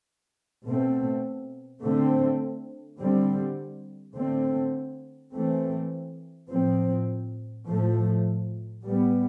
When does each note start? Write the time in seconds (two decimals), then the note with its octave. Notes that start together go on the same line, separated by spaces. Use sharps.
0.66 B2 A3 C4
1.83 D3 A3 C4
2.99 D3 G3 C4
4.16 D3 A3 C4
5.33 E3 A3 C4
6.50 A2 F3 C4
7.68 A2 F3 A3
8.84 A2 G3 B3